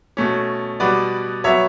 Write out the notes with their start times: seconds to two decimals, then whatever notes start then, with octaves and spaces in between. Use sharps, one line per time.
0.17 B2 A3 C#4
0.80 B2 G3 B3 B4 D5
1.44 F#3 B3 C#5 E5